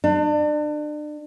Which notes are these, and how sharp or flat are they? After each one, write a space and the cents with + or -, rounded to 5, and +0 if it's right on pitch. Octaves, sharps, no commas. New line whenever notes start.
D4 +35